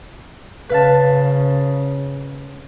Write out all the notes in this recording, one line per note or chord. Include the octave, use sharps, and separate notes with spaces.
C#3 B4 F5 A5